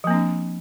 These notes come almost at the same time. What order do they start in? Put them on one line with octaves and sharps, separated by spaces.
F3 A#3 C4 D4